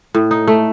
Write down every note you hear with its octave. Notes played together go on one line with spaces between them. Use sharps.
A2
D#4
A3